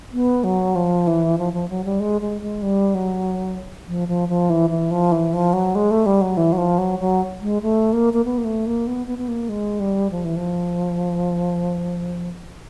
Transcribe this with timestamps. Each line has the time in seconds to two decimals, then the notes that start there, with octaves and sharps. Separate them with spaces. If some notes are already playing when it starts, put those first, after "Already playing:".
0.13 B3
0.44 F#3
0.75 F3
1.07 E3
1.38 F3
1.53 F3
1.69 F#3
1.85 G3
2.00 G#3
2.21 G#3
2.42 G#3
2.62 G3
2.95 F#3
3.88 F3
4.08 F3
4.29 F3
4.50 E3
4.70 E3
4.91 F3
5.12 E3
5.33 F3
5.53 F#3
5.75 G#3
5.91 A3
6.06 G3
6.21 F#3
6.37 E3
6.53 F#3
6.58 F3
6.78 F#3
7.00 F#3
7.41 G#3
7.62 A3
7.93 A#3
8.13 A#3
8.25 B3
8.38 A#3
8.45 A3
8.66 A#3
8.87 B3
9.07 B3
9.18 B3
9.28 A#3
9.49 G#3
9.80 G3
10.11 F3
10.24 E3
10.36 F3